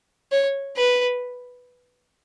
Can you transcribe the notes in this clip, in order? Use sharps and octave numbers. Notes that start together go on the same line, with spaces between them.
C#5
B4